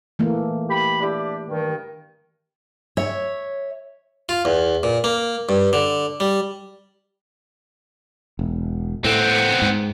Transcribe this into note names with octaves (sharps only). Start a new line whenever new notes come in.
E3 A3 A#3
G4 B5
D4 E4 G4
G2 D#3
C#5 E5
F4
E2
A#2
A#3
G2
D3
G3
E1
A2 A3 B3 C4
G#2